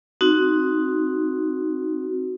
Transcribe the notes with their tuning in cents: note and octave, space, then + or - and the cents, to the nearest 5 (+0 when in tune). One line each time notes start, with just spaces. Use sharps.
C4 +0 D#4 +0 F#4 +0